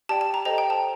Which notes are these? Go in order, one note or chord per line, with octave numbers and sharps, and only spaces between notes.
G4 D5 G5 A5
A5
A#5
A4 C5 D#5 G5 A#5
G5
A5